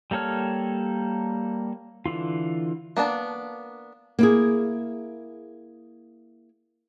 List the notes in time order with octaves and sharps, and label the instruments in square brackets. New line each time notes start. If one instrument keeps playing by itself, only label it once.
[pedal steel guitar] G3 A#3 A4 C#5 F6
D3 E3 F4
[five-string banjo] A#3 B3 D4 A5
[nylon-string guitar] A#3 E4 G#4